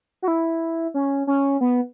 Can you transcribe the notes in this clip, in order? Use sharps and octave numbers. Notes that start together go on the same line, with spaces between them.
F#4
E4
C#4
C#4
B3